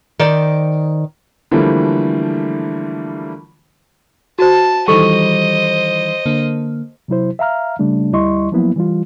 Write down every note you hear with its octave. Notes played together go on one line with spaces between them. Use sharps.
D#3 C5 D5
D3 E3 F3 G3 A3 A#3
F#4 C5 A5
D#3 E3 G3 A4 C5 D#5 G5 C#6
D3 A#3
C3 F#3 E4 C5
E5 F5 A#5 F6
C#3 G3 A3 D4
D2 G3 E4 D#5 C6 C#6
F3 F#3 A#3 B3 E4
E3 G3 F4